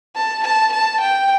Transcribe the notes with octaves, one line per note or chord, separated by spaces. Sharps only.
A5
A5
A5
G5